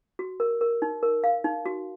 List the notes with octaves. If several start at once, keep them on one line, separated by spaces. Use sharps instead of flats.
F#4
A#4
A#4
D#4
A#4
F5
D#4
F#4